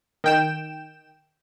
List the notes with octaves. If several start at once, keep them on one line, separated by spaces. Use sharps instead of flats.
D#3 G5 E7